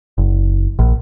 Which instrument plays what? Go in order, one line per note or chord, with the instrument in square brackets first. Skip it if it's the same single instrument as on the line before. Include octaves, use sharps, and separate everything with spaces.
[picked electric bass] F#1
A#1